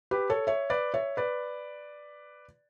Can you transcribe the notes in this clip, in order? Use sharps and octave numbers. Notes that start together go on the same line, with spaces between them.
G4 B4
A4 C#5
C#5 E5
B4 D5
C#5 E5
B4 D5